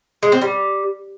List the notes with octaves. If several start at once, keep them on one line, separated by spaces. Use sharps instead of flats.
G#3
C4
G3